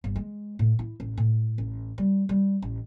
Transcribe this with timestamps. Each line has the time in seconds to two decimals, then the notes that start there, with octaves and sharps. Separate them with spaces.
0.04 G1
0.16 G#3
0.59 A2
0.79 E4
1.00 A1
1.18 A2
1.58 A1
1.98 G3
2.29 G3
2.62 A1